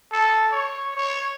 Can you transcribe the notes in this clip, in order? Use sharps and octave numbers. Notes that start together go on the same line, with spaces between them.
A4
C#5
C#5